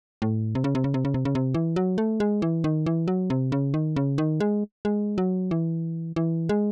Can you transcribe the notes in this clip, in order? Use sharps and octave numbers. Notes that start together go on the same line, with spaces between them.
A2
C3
C#3
C3
C#3
C3
C#3
C3
C#3
C3
E3
F#3
A3
G#3
E3
D#3
E3
F#3
C3
C#3
D#3
C#3
D#3
G#3
G#3
F#3
E3
E3
G#3